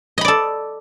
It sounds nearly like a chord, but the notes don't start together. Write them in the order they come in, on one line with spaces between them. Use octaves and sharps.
D#5 B5 D5 A4